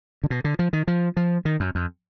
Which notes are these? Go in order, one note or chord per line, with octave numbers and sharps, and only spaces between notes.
D3
B2
D3
F3
D#3
F3
F3
D#3
F#2
F2